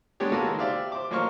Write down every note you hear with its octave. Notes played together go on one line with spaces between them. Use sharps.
G#3 B3 D4 G4 C#5
G#3 A#3 F#4 A4 B4
D#3
G4 C5 D5 E5 F5
C5 D6
A1 F#3 A#3 C5 C#6 F6